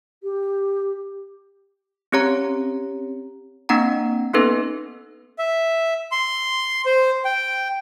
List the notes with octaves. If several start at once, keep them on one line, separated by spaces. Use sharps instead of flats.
G4
C4 C#4 G4 C#5 A#5
A#3 C4 D4 F#5 A#5
A#3 B3 C#4 D#4 A4 B4
E5
C6
C5
G5